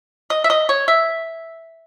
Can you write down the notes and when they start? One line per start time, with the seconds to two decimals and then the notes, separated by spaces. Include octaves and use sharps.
0.30 D#5
0.44 E5
0.50 D#5
0.69 C#5
0.88 E5